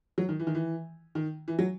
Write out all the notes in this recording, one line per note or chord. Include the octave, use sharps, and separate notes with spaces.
F#3
D#3
E3
D#3
E3
D#3
E3
F#3